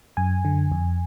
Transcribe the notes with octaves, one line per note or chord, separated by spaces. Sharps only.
F#2 G#5
D3
F2